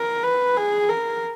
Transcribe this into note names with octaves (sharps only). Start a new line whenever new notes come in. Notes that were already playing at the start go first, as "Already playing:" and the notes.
Already playing: A#4
B4
G#4
A#4